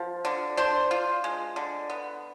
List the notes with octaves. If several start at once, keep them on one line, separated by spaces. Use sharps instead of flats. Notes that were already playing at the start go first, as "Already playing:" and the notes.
Already playing: F3
D3
D4 C5
F4
G#3
D3
B3